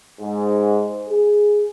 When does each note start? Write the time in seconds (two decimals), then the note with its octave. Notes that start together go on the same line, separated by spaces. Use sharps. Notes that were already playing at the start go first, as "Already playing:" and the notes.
0.19 G#2
1.09 G#4